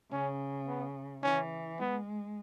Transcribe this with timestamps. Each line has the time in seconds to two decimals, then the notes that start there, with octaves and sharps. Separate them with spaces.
0.12 C#3 C#4
0.67 B3
1.23 E3 C#4
1.79 G#3 B3